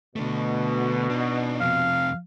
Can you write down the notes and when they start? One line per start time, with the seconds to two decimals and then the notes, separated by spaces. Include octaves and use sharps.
0.16 B2 D3 A3
1.10 D4 D#4
1.61 F2 C3 F5